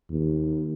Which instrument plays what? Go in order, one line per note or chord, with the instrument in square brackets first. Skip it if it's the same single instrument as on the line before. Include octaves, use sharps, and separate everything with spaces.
[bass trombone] D#2